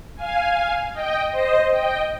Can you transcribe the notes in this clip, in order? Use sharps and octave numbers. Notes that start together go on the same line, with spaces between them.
F5 G#5
D#5 G5
C5 D#5
D#5 G5